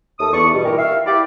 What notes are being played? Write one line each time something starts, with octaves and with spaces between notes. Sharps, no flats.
D#2 A3 A4 D#6
E2 B3 D4 D5 C#6
G2 B2
A#2 E3 G4 A#4
E5 F5
E4 G4 D5